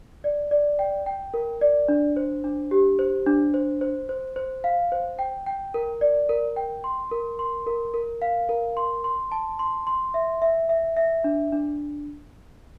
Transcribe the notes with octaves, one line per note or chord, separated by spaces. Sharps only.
D5
D5
G5
G5
A#4
D5
D4
C5
D4
G4
C5
D4
C5
C5
C5
C5
F5
C5
G5
G5
A#4
D5
A#4
G5
C6
A#4
C6
A#4
A#4
F5
A#4
C6
C6
A5
C6
C6
E5
E5
E5
E5
D4
D4